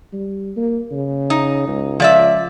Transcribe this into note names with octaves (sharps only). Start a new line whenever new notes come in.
G3
A#3
C#3
D#4
C#2
F3 D5 E5